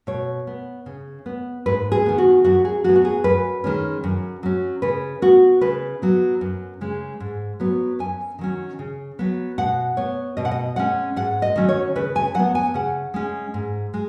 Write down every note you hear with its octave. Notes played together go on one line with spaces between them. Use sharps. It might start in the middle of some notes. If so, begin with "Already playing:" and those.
B2 C#5
B3
C#3
B3
G#2 B4
G#4
D#3 B3
F#4
F#2 F#4
G#4
F#3 B3 F#4
F#4
G#4
F#2 B4
D#3 G#3 C#4
F#2
F#3 C#4
C#3 B4
B3 F#4
C#3 B4
F#3 B3
F#2
C#3 G#3
G#2
F#3 B3
F#2 G#5
D#3 F#3 C#4
C#3
F#3 B3
B2 F#5
B3 C#5
B2 D#5
F#5
D#5
G#3 C#4 F#5
G#2 F#5
D#5
D#3 F#3 C#4
C#5
C#3 B4
G#5
F#3 B3 F#5
G#5
C#3 F#5
G#3 C#4
G#2
G#3